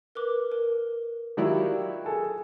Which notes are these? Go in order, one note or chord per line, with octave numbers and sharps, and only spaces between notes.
A#4 B4 D6
A#4
D#3 F#3 E4 F4 G4 D5
G#4 A4 G#5